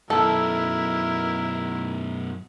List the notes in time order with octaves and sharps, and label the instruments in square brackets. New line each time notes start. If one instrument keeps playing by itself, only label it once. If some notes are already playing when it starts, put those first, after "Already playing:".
[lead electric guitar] F#2 B2 [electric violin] E4 A#4 [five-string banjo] A4